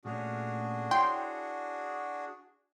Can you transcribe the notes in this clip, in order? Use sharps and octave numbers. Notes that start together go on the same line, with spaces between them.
A#2 A3 C#4 D4 F#4 G#4
E4 C#5 G5 C6